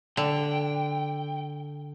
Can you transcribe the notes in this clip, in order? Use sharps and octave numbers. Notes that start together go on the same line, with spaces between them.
D3 G5